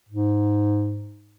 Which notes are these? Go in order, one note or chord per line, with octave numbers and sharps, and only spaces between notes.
G#2